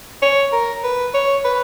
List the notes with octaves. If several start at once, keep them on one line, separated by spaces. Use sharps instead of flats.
C#5
A#4
B4
C#5
B4